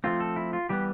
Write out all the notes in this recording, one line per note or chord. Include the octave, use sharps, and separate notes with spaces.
F3 A3 C4 F4
A4
E4
F4
E3 G3 B3 G4